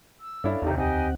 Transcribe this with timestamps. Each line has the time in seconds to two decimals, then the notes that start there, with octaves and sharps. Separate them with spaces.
0.20 E6
0.44 G2 C#4 D4 E4 A4 D5 F5
0.62 G#1 E2 C3 D#4 G4
0.78 D2 C4 D#4 G4 D#5 F#5 G#5